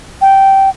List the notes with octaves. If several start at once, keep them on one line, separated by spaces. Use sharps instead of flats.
G5